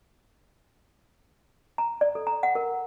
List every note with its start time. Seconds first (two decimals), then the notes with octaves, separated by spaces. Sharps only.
1.78 A#5
2.01 D5
2.15 A4
2.27 A#5
2.43 F#5
2.55 A#4